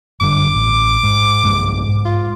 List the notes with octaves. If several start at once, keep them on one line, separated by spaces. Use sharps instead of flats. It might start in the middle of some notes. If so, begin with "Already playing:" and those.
F#1 G2 D3 D6
A1
G#2
B1 G2 G#3
G#2
F4